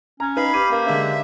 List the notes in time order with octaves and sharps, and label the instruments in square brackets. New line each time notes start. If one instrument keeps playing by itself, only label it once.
[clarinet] C#4 [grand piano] A#5
[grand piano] D#4 B4 [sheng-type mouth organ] F5 B5
[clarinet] G4 [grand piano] D#7
[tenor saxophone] A#3 [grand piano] F5
[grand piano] D3 G#3 D4 [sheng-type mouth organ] E5